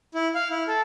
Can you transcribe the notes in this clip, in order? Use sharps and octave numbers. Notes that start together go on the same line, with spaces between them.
E4
F5
E4
A4